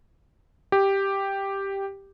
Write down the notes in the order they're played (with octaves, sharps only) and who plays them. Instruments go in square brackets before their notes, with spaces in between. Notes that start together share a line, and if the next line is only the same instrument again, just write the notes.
[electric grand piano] G4